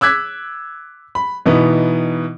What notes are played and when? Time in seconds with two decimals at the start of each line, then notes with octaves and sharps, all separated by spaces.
0.01 D6 E6 F#6 G#6 B6
1.15 B5
1.46 B2 E3 B3 D#4